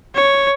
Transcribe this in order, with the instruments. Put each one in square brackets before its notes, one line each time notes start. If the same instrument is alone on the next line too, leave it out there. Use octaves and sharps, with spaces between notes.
[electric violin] C#5